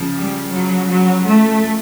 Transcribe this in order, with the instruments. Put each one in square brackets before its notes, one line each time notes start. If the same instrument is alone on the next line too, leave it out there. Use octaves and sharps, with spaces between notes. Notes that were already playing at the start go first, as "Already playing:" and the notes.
Already playing: [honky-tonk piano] C#3 F3
[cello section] G3
F#3
F#3
A3